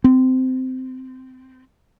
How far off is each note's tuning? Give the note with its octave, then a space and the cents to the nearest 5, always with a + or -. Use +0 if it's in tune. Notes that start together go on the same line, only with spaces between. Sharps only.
C4 -20